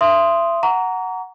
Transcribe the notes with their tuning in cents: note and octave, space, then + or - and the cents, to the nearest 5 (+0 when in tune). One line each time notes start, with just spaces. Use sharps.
E5 +35 C6 +0 D#6 +0
F#5 +0 A#5 -5 C#6 +45